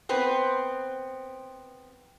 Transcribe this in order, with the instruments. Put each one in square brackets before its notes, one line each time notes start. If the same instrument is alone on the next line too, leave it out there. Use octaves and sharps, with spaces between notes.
[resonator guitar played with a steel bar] B3 C4 B4